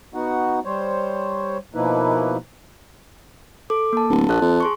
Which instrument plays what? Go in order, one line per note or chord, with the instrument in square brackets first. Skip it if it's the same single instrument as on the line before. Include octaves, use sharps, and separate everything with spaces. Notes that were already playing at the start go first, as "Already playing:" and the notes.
[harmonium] B3 D#4 F#4 F#5
G3 C5 C#5
B2 F3 A#3 D#4 E4 B4
[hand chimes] A4 D6
A#3 A5
[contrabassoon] D1
[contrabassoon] A#1 [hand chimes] A5 F#6
[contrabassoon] F2
[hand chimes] G#4 C6 C#6